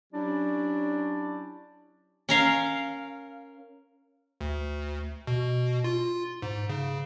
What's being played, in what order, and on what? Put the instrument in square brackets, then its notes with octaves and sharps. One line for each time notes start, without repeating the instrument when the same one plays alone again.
[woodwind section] F#3 C#4 D4 E4 G4 D5
[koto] C#4 A#4 F5
[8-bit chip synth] D2
B2
F4
G#2
C#3